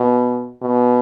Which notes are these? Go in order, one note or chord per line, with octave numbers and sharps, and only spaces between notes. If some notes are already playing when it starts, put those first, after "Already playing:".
Already playing: B2
B2